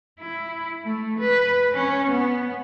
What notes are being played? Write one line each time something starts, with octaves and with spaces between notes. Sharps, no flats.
E4
A3
B4
C#4
B3